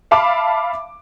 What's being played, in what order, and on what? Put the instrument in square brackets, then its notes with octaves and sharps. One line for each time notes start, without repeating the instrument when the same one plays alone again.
[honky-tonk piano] E5 F5 A5 B5 D6